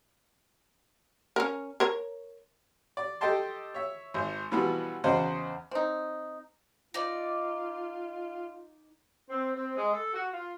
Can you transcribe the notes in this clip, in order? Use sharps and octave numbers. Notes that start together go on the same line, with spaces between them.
C#4 A#4
A#4 C#5
D5
G4 A4 D#5 G5 A5 C6
C#5 E5
G#1
B2 E3 F3 G3 B3 F#4
E2 C#3 F#4 C5 D#5 F#5
C4 D#4
D#4 F4 D5
C4
C4
G#3
A4
F#4
F4